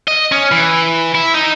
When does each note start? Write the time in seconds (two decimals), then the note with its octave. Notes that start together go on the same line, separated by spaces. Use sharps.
0.08 D#5
0.32 C#4
0.52 E3
1.15 E4
1.34 D#4